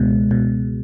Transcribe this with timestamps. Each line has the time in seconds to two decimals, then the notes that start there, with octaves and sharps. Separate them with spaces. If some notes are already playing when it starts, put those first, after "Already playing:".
Already playing: C#2 B2 G#3
0.31 B2